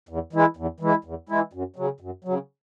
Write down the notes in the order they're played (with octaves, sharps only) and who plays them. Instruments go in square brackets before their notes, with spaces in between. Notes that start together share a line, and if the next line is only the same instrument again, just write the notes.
[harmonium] E2
E3 G#3 E4
E2
E3 G#3 E4
E2
E3 G#3 E4
F#2
C#3 F#3
F#2
C#3 F#3